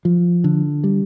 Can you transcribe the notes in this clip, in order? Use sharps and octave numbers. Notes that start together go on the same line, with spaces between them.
F3
D3
G3